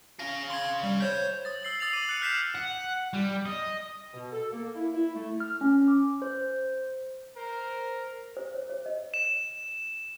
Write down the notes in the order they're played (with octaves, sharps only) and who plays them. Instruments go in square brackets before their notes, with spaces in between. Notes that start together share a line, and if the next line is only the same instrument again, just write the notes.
[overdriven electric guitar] G#4 F5 [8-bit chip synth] A#6
[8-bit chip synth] C6 G#6
G3
C5 C#5 G6
[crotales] D#6 A6
E6 C7 F#7
D#6 A6 C7 F7 F#7
D6 D#7
F#6 C#7
F6 G6 B6 C7 E7
[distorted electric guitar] F#5
G3
D#5
[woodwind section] B2
A4
A#3
E4
E4
A3
[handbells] F6
C#4
D6
C5
[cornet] A#4 [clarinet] C5
[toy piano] C5
C#5
C#5
D#5
[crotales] E7